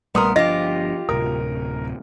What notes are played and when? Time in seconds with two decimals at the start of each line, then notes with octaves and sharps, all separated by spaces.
0.15 A#1 G3 A3 B3 A#4 C6 D#6
0.36 G1 F3 D4 F4 G4 D#5 A#6
1.09 D1 C3 A#4 D#6